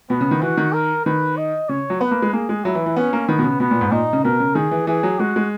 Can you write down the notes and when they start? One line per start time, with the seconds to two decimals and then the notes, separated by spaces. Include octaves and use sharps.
0.10 B2 B3
0.21 C#3
0.31 D#3
0.42 E3 F#4
0.57 D#3
0.73 A#4
1.06 D#3 B4
1.37 D#5
1.69 C#3 C#5
1.90 F#3
2.00 B3 B4
2.11 A#3
2.22 G#3
2.33 A#3 G#4
2.49 G#3
2.64 F#3 E4
2.75 E3
2.86 E3
2.96 B3 C#4
3.13 A#3
3.29 D#3 B3
3.39 B2
3.44 C#3
3.60 B2 B3
3.71 A#2
3.81 G#2
3.92 A#2 D#4
4.13 C#3
4.24 B2 A#4
4.40 C#3
4.55 D#3 G#4
4.71 E3
4.87 E3 G#4
5.03 F#3
5.19 G#3 F#4
5.36 G#3